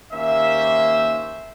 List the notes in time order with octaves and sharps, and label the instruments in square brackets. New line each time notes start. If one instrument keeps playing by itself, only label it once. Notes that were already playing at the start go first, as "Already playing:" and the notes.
[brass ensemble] D#2 A#3 C#4 C5 E5